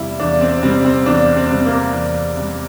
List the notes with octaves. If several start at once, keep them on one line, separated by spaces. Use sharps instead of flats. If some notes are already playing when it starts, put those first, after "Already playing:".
Already playing: E2 C3 G3 E4
E2 D4
C4
C3 G3 C4
C4
E2 D4
C4
C3 G3
A#3
E2
C3 G3